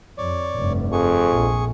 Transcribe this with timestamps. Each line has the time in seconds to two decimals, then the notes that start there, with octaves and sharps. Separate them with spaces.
0.18 F2 C#5 D5
0.56 F1 G2
0.92 F2 G#4 C#6
1.31 A#1